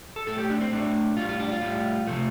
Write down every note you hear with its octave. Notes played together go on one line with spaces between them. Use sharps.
A4
A2 A3 A4
G4
D4
C4
A2 A3 D4
A2 G3 F4
F4
D4
F4
A2 G3
C3 F3 A3